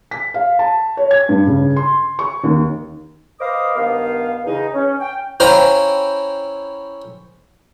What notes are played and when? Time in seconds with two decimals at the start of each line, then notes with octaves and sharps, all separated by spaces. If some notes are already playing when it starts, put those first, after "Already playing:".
0.11 B6
0.34 F5
0.59 A5
0.97 C#5
1.11 G#6
1.29 G2
1.46 C#3
1.76 C6
2.19 C#6
2.43 D#2
3.40 B4 C5 D#5 F5 D6 D#6
3.75 G2 D#3 B3 F5
4.44 E2 C#3 D#4
4.74 C#4
5.00 G5
5.40 C#4 E4 C5 F5 G5 A#5